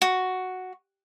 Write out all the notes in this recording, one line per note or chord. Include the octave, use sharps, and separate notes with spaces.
F#4